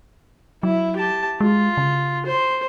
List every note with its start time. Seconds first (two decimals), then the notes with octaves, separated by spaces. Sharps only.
0.63 F#3 E4
0.96 G4 A5
1.41 G#3 F4
1.77 C#3
2.26 C5